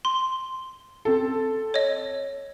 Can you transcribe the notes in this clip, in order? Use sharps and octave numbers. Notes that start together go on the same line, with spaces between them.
C6
C4 A4
C#5 D#5